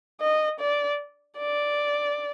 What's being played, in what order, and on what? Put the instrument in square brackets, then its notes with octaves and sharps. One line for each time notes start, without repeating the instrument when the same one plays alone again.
[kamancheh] D#5
D5
D5